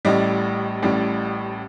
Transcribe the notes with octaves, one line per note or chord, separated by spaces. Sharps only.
A1 A2 G3 D#5
A1 A2 G3